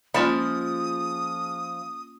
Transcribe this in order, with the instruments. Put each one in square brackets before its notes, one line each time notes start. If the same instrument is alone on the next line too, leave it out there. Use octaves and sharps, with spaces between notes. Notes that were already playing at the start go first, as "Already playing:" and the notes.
[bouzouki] F3 [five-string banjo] G#3 A5 B5 [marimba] A#3 C#4 F4 [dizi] D#6